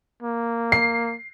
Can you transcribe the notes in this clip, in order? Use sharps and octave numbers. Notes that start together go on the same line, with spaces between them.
A#3
C7